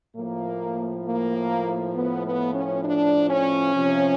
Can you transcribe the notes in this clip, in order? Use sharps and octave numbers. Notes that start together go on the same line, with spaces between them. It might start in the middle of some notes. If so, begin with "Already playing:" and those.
A2 F3 A#3
A#3
B3
B3
C#4
D4
C#4
C3 F3